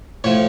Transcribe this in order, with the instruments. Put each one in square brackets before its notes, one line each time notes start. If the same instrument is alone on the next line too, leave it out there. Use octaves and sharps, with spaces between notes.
[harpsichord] A2 F3 C#5